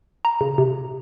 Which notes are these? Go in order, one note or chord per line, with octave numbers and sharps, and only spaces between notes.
A#5
C#3
C3